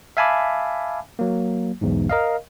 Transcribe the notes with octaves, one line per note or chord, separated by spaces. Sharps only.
E5 F5 G#5 A5 B5 D6
F#3 A#3
B1 E2 G#2
A#4 D#5 F5